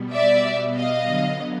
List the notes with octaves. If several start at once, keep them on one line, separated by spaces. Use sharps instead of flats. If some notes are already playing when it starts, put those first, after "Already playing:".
Already playing: B2 G3 B3
D5 E5
D#5 F5
D3 F#3 B3